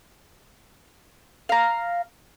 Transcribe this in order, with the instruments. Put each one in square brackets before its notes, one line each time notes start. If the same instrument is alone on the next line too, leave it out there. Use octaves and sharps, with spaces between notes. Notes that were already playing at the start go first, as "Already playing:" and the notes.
[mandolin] F5 A#5